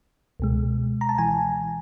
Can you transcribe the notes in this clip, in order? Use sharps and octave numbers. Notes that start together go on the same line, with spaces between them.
C#2 B2 G#3
A#5
A5
E3 G#5